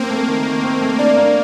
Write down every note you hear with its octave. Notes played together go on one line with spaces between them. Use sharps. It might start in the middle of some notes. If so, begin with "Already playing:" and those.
Already playing: A#3 C4
A3
D#3
D#3
C4
A3
A#3 D4
A#3